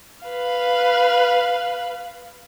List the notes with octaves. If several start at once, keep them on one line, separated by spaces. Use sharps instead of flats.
B4 F5